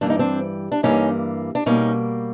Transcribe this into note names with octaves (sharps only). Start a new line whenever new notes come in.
G2 E3 G3 A#3 D4
D#4
C4 D4
D4
G2 E3 G3 A#3 C#4 D#4
D4
B2 G3 A#3 C#4 D#4